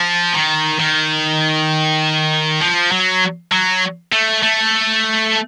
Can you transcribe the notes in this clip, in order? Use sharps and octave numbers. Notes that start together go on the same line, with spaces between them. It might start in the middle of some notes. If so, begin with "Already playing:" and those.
Already playing: F3
D#3
D#3
F3
F#3
F#3
A3
A3